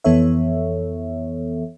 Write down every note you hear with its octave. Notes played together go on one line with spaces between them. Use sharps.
F2 E3 B3 A4 C#5 E5